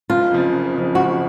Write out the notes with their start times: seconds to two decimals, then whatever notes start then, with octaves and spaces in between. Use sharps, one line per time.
0.10 F#1 F4
0.31 F2 C#3 F3
0.52 F#1
0.74 F2 C#3 F3
0.95 F#1 F#4